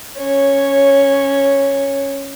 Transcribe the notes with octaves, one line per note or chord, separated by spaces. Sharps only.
C#4 C#5